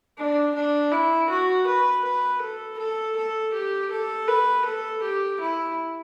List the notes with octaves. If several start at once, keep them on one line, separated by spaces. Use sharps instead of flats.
D4
D4
E4
F#4
B4
B4
A4
A4
A4
G4
A4
B4
A4
G4
E4